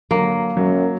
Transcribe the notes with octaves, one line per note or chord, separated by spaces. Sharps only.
D3 F#3 A#3
F#2 F#3